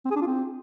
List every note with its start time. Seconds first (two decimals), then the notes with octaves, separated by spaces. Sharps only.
0.05 C4
0.11 G#4
0.16 D4
0.21 F4
0.27 C4